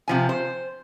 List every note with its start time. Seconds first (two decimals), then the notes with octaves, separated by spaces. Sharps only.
0.08 C3 F3 G#5
0.29 C5